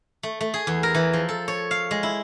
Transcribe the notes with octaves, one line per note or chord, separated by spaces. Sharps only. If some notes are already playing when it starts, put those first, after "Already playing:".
A3
A3
G#4
E2
A#4
E3
F3
A4
C#5
F5
G#3
E4